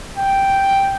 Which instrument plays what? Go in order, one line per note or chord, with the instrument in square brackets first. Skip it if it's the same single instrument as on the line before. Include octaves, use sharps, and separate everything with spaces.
[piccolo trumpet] G5